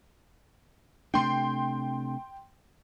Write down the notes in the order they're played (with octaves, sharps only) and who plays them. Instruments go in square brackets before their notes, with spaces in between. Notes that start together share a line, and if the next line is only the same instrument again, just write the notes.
[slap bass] C3 A3 D4 [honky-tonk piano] G5 C6